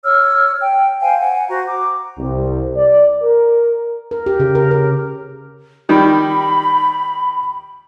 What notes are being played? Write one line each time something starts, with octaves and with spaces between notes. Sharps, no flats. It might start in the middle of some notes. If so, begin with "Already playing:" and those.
C#5 E6 F6
G5
C5 F5 G5 G#5
F#5 G#5
F#4 C5 A#5
A#5 D6
C2
D5
A#4
A#4
G4
C#3
A#4
A#4
D#3 G3 B5